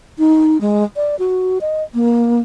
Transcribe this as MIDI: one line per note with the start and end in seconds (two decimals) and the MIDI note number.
0.19 0.58 63
0.61 0.84 56
0.96 1.18 74
1.19 1.58 66
1.61 1.83 75
1.94 2.40 58